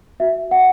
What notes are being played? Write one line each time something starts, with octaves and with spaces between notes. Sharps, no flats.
F#4 E5
F#5